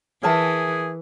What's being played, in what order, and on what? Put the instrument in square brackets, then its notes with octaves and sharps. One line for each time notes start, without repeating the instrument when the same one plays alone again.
[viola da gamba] E3 [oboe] G#4 [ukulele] A#4 E5 A5